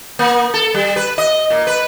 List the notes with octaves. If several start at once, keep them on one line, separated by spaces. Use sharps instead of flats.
A#3
A4
G3
B4
D#5
A#2
B4